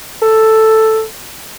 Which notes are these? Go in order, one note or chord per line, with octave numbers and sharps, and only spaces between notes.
A4